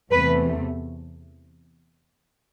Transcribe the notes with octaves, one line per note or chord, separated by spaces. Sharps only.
E2 C3 E3 A3 B4